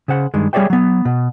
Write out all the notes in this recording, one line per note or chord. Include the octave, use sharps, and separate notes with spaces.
C#3 C5 F#5
G2 D#3 G#3
G3 G#4 C#5 D5 E5 G5
F#3 B3
B2